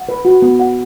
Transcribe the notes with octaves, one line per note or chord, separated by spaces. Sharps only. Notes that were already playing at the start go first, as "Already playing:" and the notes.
Already playing: F#5
B4
F#4
B3
F#5